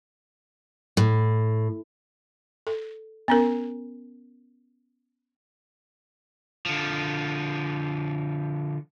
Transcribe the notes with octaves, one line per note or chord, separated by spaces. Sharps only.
A2
A4
B3 C#4 A#4
D3 F3